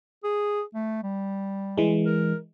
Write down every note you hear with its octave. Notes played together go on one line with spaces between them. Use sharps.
G#4
A3
G3
E3 G#3
A#4